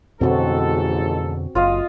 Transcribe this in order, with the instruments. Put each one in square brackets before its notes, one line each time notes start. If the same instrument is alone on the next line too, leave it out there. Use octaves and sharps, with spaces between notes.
[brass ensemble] A1 G#2 A4 [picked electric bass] F2 B2 D3 [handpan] C4 F#4
[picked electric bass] F#1 [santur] F4 D#5 F5